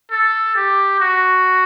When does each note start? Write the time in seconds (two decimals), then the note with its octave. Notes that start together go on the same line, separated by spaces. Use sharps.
0.11 A4
0.56 G4
1.00 F#4